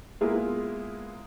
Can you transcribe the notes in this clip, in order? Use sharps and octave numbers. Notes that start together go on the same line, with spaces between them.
G#3 A#3 B3 E4 F4 G#4